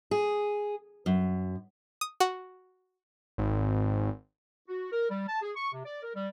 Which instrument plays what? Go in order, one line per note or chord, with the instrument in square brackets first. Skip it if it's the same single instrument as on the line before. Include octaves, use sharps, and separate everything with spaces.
[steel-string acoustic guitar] G#4
F#2
[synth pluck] D#6
F#4
[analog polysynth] G#1
[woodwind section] F#4
A#4
G3
A5
G#4
C#6
C3
D5
A#4
G3